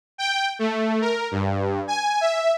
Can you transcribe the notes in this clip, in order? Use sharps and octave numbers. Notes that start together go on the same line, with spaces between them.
G5
A3
A#4
G2
G#5
E5